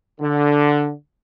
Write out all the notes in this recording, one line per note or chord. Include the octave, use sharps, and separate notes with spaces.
D3